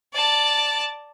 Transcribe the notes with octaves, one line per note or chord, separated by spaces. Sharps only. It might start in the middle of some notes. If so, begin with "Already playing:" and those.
D5 A5